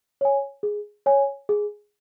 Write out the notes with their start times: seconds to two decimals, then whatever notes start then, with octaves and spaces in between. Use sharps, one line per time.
0.21 C#5 G#5
0.63 G#4
1.06 C#5 G#5
1.49 G#4